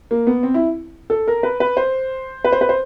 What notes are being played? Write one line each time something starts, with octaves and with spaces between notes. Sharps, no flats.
A#3
B3
C4
E4
A4
A#4
B4
B4
C5
B4
C5
B4
C5